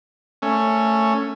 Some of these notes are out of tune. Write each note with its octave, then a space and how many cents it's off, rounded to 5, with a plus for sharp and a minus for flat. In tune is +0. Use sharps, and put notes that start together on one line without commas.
A3 +10 C#4 +0